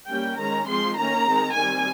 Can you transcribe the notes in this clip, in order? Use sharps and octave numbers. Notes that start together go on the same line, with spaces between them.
G3 A#3 C#4 G5
D#3 G#3 C#4 A#5
F3 G#3 C4 C6
D#3 A#3 C#4 A#5
D#3 G#3 C4
D#3 G3 C4 G#5